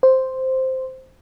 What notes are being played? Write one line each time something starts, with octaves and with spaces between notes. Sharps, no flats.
C5